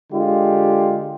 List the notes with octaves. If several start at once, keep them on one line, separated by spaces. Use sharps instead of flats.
D3 G#3 F4 G4